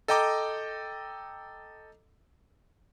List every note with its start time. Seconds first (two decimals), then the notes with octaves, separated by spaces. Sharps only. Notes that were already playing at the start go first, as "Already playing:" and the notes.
0.08 A4 D#5 G5 A#5 D6